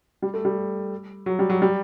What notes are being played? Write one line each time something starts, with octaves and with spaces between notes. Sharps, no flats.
G3
A3
G3
F#3
G3
F#3
G3